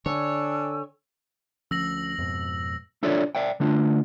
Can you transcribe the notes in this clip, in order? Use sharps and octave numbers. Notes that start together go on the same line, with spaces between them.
D3 D4 C#5 G5 G#5 E6
D2 F3 C#4 E6 A#6 F#7
F2 G#2 B2
D4 F4 A4 C#5 D5 E5
D5 E5 G5
D3 A3 D4 F4